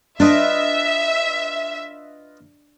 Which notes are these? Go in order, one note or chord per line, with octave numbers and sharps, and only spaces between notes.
D4 F4 B4 D#5 E5